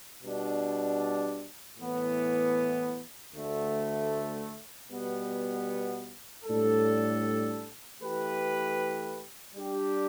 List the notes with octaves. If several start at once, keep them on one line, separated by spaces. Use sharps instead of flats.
B2 G3 D4
A2 E3 B3
D2 D3 A3
B2 G3 B3
A2 G3 D4 A4
E3 A3 G4 B4
G3 D4 G4